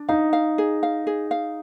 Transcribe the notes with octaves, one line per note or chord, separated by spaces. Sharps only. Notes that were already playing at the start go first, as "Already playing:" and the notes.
Already playing: D4
D#4 F5
F5
G#4
F5
G#4
F5